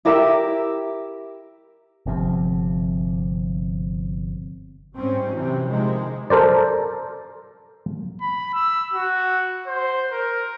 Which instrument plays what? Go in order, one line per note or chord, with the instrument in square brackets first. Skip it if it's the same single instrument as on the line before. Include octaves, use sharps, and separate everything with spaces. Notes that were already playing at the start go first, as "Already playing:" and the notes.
[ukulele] E4 G4 A#4 E5
[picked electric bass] G1 C3 F3
[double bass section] G#2 G3 C4 C#4
C3 E3 F#3
C3 D#3 F3 G#3
[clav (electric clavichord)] A4 A#4 C5 D5
[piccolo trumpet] B5
E6
F#4
C5
A#4